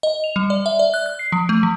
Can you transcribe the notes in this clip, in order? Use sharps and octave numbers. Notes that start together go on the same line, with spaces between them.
D#5
F7
G3
D5
E5
D5
F#6
F#6
C7
F3
A3
F3